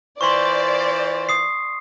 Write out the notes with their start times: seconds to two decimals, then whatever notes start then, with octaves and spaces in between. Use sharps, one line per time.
0.21 E3 F4 C5 D5 C6 C#6
1.29 D#6 C7